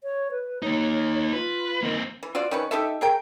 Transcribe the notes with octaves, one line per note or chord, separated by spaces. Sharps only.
C#5
B4
A#3 D#4 C#5
F4 B4
D#3 A#3 C4
E3
F4 F#4 C5 D5
D#3 C#4 B4
D#4 G4 A4 E5
G#4 A#4 G5